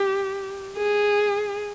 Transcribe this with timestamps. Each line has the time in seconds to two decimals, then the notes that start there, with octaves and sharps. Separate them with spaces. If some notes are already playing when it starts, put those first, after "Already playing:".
Already playing: G4
0.77 G#4